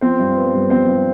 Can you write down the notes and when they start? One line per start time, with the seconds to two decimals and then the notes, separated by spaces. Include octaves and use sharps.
0.01 F3 C4 C5
0.19 G2
0.37 B3
0.54 G2
0.70 F3 C4 C5
0.88 G2